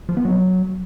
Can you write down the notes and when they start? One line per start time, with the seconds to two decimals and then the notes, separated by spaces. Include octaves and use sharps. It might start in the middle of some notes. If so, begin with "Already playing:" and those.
0.09 F3
0.17 B3
0.25 F#3